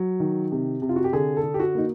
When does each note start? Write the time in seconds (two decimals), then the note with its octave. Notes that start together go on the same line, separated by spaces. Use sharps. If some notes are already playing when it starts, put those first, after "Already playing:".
Already playing: F#3
0.20 D#3
0.52 C3
0.82 C3
0.89 F4
0.96 F#4
1.04 G4
1.13 D3 G#4
1.37 A4
1.43 D3
1.54 G4
1.60 F#4
1.75 A#3 D#4